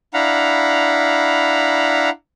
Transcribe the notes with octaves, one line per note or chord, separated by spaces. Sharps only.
D4 E4 F5 F#5 A#5 B5